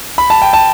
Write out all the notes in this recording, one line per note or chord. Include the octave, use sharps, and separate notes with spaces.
B5
A5
G5
A5